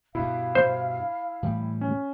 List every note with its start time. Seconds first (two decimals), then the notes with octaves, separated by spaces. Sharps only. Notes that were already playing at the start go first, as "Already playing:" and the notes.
0.15 G2 B2 E4 F5
0.55 C5
1.43 A2 E3 G3
1.81 C#4